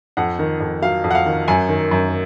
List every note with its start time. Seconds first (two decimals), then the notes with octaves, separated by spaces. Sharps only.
0.17 F2 F#5
0.39 D#3
0.61 F2
0.82 F#3 F5
1.04 F2
1.11 F#5
1.15 F5
1.26 D#3
1.48 F#2 G#5
1.69 D#3
1.91 F#2